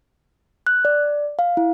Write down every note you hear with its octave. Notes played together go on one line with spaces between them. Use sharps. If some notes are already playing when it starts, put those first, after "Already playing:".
F#6
D5
F5
E4